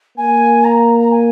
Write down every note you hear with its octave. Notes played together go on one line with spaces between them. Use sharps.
A#3 G#5
A#5
A#5
G#5